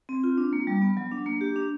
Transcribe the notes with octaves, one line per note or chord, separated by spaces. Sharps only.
C4
F4
D4
A#3
G3
B3
F#3
D4
A#3
G4
D4